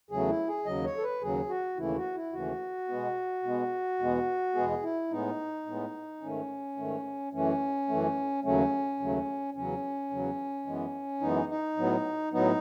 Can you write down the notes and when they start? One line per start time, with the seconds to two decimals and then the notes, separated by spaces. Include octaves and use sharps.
0.10 E2 C#3 F#3 A3 G#4
0.29 E4
0.48 G#4
0.66 D#2 C#3 F#3 D#5
0.85 C#5
0.97 A4
1.03 B4
1.22 D#2 C#3 F#3 G#4
1.49 F#4
1.77 D#2 C#3 E3 A3 E4
1.96 F#4
2.15 E4
2.32 D#2 C#3 E3 A3 F#4
2.88 B2 G#3 B3
3.43 B2 G#3 B3
3.99 E2 B2 G#3 B3
4.55 E2 B2 G#3 B3 G#4
4.83 E4
5.11 A2 G#3 B3 D#4
5.66 A2 G#3 B3
6.21 G#2 D#3 A3 C#4
6.77 G#2 D#3 A3
7.33 F#2 E3 A3 C#4
7.88 F#2 E3 A3
8.44 D#2 C#3 F#3 A3 C#4
9.00 D#2 C#3 F#3 A3
9.54 E2 C#3 F#3 C#4
10.10 E2 C#3 F#3
10.66 F#2 E3 G#3 B3
11.21 F#2 E3 G#3 B3 D#4
11.49 D#4
11.77 A2 F#3 B3
12.33 A2 F#3 B3 D#4